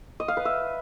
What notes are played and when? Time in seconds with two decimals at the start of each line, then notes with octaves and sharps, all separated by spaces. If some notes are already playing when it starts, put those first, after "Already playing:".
0.20 D#5
0.28 F5
0.37 B4
0.45 E5